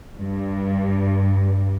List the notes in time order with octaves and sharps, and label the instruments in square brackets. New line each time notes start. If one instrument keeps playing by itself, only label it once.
[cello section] G2